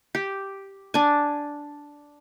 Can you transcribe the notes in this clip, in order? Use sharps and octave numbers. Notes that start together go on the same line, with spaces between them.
G4
D4 G#5